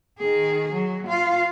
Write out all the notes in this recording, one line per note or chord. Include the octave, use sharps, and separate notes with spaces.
D#3 G#4
F#3
F4 F5